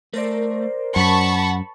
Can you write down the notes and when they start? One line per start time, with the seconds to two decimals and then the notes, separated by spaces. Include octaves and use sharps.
0.14 A3 A#4 C5 D5
0.96 F#2 F#5 A5 B5 C#6